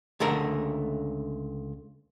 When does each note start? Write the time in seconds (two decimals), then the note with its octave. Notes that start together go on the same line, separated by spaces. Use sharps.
0.20 C#2 D3 A3 A#4